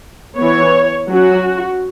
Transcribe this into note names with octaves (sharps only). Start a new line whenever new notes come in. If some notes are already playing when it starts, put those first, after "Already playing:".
E3 B3 C#5
F#3 C#4 F#4